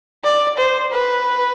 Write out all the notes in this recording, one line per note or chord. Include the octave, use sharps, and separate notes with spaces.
D5
C5
B4